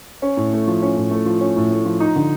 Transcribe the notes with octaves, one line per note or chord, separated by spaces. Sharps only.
C#4
A2
A3
F3
C#4
A2
A3
F3
C#4
A2
A3
F3
D#4
D3